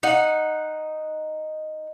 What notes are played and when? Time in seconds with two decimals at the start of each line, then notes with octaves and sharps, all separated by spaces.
0.03 D#4 F#5